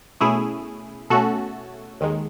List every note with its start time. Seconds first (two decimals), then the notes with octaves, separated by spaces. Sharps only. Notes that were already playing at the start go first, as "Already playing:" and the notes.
0.20 B2 A3 C#4 E4 G#4
1.10 B2 A3 C#4 F#4 A4
2.01 D#2 D#3 G#3